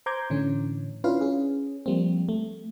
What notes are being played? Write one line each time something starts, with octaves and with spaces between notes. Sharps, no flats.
C5 A#5 C6 D6 G6 G#6
A2 D3 E3 C#4
C#4 D4 E4 F4 B4 F5
C#4 G#4
F3 G3 A#3 C4
A3